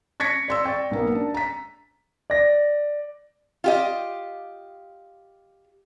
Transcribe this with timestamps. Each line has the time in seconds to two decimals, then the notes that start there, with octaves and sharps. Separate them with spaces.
0.20 C#6 G#6 A#6 B6 C#7
0.48 D5 C6 E6
0.64 D5 G5 C#6 A6
0.91 B1 A#3 B3
1.15 D4
1.34 A#5 B6
2.30 D5 A#6
3.64 F4 G4 D#5